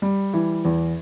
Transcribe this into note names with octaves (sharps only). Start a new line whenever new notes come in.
G3
E3
E2